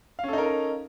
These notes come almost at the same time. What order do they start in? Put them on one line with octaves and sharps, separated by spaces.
F5 C#4 A4 D#4 A#4